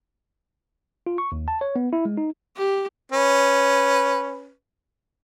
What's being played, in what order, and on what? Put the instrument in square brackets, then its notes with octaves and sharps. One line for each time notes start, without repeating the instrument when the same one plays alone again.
[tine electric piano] F4
C#6
D#2
A5
C#5
B3
E4
G#3
D#4
[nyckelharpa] G4
[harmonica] C#4 B4